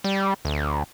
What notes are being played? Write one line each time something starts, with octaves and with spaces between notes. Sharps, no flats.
G3
D2